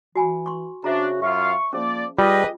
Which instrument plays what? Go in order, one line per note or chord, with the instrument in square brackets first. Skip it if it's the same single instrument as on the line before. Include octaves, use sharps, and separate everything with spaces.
[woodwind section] E3 [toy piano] F#4 G#5 B5
[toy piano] C6 C#6
[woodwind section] C#3 F#4 [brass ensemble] D4 [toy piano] C5 E5 A#5
[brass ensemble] F#2 F4 F5 [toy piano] E5 [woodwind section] C#6
[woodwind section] F3 A#3 [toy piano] C#4 G#4 [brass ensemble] D5
[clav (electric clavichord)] G3 [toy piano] F4 G5 [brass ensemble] G4 B4 D#5 [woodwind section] G#4